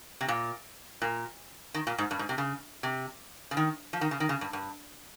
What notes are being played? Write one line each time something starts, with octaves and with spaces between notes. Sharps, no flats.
C3
A#2
A#2
D#3
A#2
G#2
G2
G#2
C3
C#3
C3
C#3
D#3
F3
D#3
C#3
D#3
C#3
G2
G2